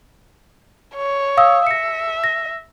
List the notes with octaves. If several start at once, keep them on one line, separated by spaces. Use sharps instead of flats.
C#5
F5 D#6 E6
E5 A#6 C#7
A#6